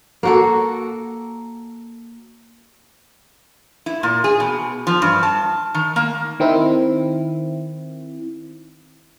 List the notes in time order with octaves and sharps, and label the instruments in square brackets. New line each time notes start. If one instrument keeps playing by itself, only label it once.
[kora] A#3 F#4 A4
[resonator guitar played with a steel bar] E4
A#2
G#4
B2
F3
G2
A5
D#3
A#3
[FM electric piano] D#3 C4 E4